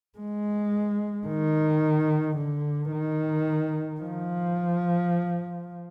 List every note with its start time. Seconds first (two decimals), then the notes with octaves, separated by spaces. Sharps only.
0.18 G#3
1.27 D#3
2.37 D3
2.92 D#3
4.01 F3